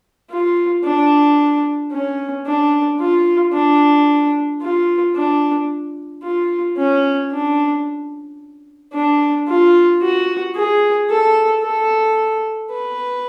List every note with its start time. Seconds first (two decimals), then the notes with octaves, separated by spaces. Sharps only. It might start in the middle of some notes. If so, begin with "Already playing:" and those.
0.30 F4
0.84 D4
1.92 C#4
2.46 D4
3.00 F4
3.53 D4
4.62 F4
5.15 D4
6.23 F4
6.78 C#4
7.32 D4
8.94 D4
9.48 F4
10.02 F#4
10.56 G#4
11.10 A4
11.63 A4
12.71 B4